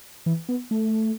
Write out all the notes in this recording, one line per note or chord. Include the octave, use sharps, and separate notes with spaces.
E3
B3
A3